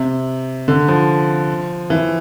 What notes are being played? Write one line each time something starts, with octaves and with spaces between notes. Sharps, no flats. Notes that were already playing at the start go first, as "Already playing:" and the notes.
Already playing: C3
D3
F3
E3